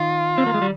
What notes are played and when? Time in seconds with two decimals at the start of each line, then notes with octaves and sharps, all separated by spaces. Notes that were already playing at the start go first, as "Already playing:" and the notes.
Already playing: D#3 F4
0.38 C4
0.46 A#3
0.54 G#3
0.62 G3